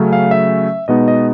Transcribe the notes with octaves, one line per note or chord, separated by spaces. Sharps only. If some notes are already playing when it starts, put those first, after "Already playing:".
Already playing: C#3 F#3 A3 C#4
F5
E5
B2 G#3 B3 D#4 D#5
D#5